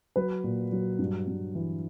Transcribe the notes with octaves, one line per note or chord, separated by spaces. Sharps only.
F#3 B4
A#2
F#3
G2
G2
E3